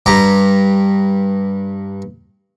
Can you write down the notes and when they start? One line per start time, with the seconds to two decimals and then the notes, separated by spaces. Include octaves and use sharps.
0.06 G2 G4 A#5